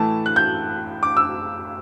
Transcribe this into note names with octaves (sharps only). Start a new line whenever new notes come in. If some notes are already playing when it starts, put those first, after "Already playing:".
Already playing: A2 E3 A3 A5
F#6
G6
D6
E6